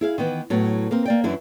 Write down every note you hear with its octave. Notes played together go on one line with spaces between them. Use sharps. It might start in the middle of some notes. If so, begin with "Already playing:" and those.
E4 G#4 F5
D#3 E3 B3
A2 F#3 B3
A#3 C4 A#4
A#3 D5 G5
F#2 E3 D4 E4